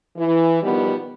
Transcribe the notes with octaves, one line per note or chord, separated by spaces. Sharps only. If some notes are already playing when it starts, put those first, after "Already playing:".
E3
B2 D#3 F3 G3 B3